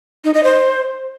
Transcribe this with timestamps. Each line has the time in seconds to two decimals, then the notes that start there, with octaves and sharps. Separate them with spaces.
0.24 D#4
0.34 D#5
0.44 C5